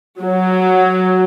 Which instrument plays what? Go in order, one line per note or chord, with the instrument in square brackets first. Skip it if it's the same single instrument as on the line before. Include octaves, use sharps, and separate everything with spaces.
[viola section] F#3